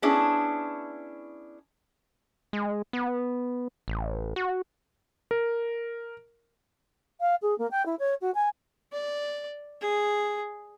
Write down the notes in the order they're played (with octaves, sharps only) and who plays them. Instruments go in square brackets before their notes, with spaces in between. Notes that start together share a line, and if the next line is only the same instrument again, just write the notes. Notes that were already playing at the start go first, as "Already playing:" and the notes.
[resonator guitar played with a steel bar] B3 C#4 D4 E4 G#4
[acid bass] G#3
B3
A1
F#4
[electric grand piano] A#4
[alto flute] F5
G#4
A#3
G5
E4
C#5
F#4
G#5
[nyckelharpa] D5
G#4